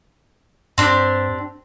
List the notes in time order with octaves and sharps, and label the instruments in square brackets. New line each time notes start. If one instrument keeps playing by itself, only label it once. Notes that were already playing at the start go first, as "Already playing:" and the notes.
[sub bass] G2 [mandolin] C4 D4 G4